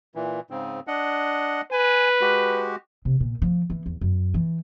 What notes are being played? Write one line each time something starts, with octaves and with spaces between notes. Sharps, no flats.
A#2 E3
G#2 C#3 C4
D4 D#5 F#5
B4 G#5
G#3 F#4 G4
C3
A#2
F3
E3
E2
F#2
E3